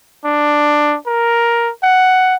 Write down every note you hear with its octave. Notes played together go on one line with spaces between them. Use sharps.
D4
A#4
F#5